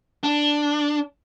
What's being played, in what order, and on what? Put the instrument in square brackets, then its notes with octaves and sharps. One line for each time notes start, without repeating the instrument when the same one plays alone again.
[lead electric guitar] D4